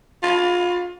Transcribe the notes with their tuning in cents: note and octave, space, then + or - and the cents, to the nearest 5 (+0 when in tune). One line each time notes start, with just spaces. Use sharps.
F4 +25